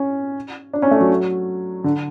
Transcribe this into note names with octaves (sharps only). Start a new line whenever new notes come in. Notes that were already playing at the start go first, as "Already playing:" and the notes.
Already playing: C#4
D4
C#4
A3
F#3
D3